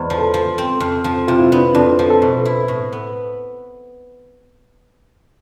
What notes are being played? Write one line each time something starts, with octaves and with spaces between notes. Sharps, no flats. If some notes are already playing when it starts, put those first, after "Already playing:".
Already playing: E2 G#3 C5 D5
F3
A4
F3
C4
F2
F3
C3 F4
E4
B3 D4
C4
F2 D4
C5
F3 A4
A4
B2
E4
A2
B3